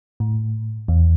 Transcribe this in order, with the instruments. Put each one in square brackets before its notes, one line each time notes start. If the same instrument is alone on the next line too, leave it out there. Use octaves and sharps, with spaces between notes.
[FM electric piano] A2
E2